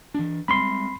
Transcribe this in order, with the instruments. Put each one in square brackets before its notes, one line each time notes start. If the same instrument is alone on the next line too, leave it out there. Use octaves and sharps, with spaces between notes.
[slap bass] E3 D4
[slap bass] G3 G#3 C4 [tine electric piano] B5 C6